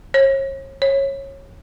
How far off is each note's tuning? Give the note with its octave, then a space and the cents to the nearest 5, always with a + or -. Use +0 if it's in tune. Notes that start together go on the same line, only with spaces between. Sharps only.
C#5 -40
C#5 -20